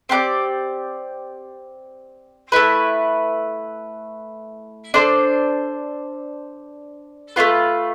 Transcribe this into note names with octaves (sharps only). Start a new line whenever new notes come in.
C4 G4 B4 D5
A3 E4 B4
D4 A4 C5
A3 D4 F4 B4